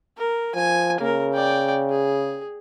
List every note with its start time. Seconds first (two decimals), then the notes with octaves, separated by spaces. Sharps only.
0.18 A#4
0.55 F3 G#5
1.00 C#3 A#3 A#4
1.33 D5 G5
1.90 G#4